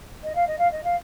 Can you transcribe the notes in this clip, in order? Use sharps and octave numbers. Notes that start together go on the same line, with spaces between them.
D#5
F5
D#5
F5
D#5
F5